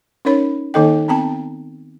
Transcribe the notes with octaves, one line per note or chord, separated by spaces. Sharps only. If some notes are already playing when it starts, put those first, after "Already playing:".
C#4 D#4 A#4 C#5 B5
D#3 A#3 D#4 A4 D#5 G5
B3 C4 G5 A5 A#5